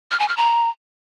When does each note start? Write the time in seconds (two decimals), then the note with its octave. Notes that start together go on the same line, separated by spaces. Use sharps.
0.11 F6
0.20 G#5
0.28 F6
0.37 A#5